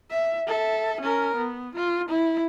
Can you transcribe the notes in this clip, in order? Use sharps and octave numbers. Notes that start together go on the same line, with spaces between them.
E5
A4 E5
C#4 A#4
B3
F4
E4